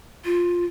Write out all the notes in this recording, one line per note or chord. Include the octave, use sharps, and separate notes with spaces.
F4